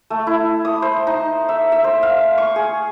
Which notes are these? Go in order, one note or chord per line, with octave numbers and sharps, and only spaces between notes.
A3
E4
D#6
C5
D#4
E5
E5
C5
F5
C#6
G#4